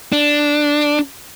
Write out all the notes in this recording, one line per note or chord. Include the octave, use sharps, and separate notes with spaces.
D4